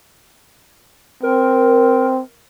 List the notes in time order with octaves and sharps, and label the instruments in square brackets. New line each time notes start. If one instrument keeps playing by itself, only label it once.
[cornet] C4 [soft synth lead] A#4